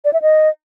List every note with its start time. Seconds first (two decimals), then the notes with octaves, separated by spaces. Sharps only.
0.05 D5
0.13 E5
0.22 D#5